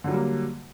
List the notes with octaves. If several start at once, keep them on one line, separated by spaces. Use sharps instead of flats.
D3 F#3 G3 A#3